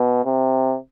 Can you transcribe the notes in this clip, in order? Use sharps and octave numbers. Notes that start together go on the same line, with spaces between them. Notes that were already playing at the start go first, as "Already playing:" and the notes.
Already playing: B2
C3